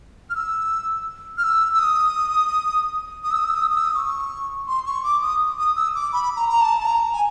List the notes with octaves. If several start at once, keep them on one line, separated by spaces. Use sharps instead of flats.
F6
E6
F6
E6
E6
D#6
D#6
E6
D#6
E6
D#6
E6
D#6
E6
D#6
C#6
C6
C#6
D6
D#6
D#6
E6
D6
B5
A#5
A#5
A5
A5
A#5
G#5